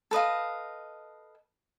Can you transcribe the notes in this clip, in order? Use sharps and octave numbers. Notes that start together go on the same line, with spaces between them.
A4 B4 D#5 F5